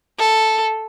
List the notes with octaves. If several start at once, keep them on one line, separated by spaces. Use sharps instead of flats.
A4